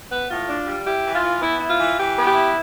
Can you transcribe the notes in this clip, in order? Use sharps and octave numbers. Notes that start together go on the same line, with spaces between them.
B3 B4
A2 F4
D4
G3
E4 G4
E3
F4
E3
B3 E4
E4
F4
E3
E3 G4
B3
G4
E4